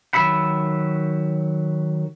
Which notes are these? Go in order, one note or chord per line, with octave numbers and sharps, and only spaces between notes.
D#3 F#3 E5 B5